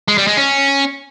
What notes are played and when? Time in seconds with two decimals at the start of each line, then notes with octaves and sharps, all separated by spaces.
0.08 G#3
0.18 G3
0.27 G#3
0.37 C#4